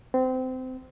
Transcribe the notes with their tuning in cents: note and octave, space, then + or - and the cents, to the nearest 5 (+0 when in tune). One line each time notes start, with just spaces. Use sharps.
C4 -25